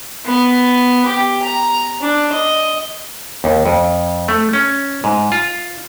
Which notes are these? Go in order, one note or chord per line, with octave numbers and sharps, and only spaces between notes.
B3
G4
A#5
D4
D#5
D#2
F2
A3
C#4
G#2
F4